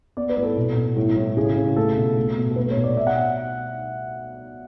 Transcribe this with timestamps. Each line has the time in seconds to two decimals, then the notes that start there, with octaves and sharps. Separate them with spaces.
0.17 B3 D5
0.29 B4
0.37 A2
0.43 A4
0.56 B2
0.76 B2
0.96 A2
1.16 A2
1.37 C#3 G#4
1.57 C#3
1.76 A3 A4
1.97 B2
2.17 A3
2.37 B2
2.51 A4
2.56 A3 B4
2.70 C#5
2.77 B2
2.84 D5
2.97 B2 E5
3.07 F#5